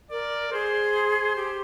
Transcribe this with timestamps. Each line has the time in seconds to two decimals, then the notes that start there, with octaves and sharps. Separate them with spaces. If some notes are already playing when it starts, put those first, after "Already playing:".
0.11 A#4 D5
0.53 G#4 C5
1.36 G4